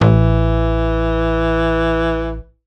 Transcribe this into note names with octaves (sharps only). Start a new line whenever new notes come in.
A1 E3